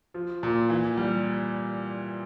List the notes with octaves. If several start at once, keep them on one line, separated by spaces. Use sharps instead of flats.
F3
A#2
E3
G3